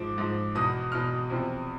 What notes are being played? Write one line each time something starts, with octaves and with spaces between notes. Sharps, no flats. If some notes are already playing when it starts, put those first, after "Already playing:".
Already playing: G#2 F3 D6
G#2 F3
E2 B2 D#6
E2 B2 F6
E2 C3 F3